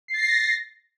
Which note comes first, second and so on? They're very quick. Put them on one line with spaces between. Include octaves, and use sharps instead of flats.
C7 A6 A#6